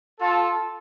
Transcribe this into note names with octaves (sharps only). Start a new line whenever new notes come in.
F4 A4